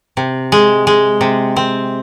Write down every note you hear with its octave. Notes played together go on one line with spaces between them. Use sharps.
C3
G#3
G#3
C3
C4